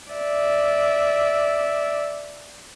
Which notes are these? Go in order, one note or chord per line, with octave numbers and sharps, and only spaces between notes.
D5 E5